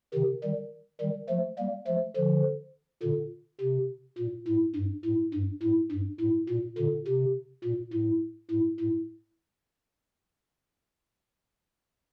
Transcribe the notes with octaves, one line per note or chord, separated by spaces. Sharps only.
C3 D#3
D#3 G3
D#3 G3
F3 A3
G3 A#3
F3 A3
D3 F3
A#2 D3
C3
A#2
A2
G2
A2
G2
A2
G2
A2
A#2
A#2 D3
C3
A#2
A2
A2
A2